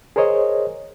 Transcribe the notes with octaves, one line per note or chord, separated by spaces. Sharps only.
G#4 A#4 C5 C#5 D#5